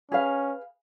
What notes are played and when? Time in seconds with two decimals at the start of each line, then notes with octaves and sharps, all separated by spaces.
0.11 C#4 G#4 B4 F5